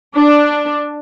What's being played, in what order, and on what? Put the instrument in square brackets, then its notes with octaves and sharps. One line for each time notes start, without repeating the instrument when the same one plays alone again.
[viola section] D4